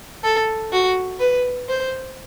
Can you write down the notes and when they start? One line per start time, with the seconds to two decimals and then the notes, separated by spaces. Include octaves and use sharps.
0.24 A4
0.72 F#4
1.20 B4
1.69 C5